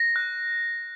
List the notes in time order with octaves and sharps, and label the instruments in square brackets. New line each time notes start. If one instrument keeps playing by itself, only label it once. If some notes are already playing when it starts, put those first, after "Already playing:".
Already playing: [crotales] A#6
F#6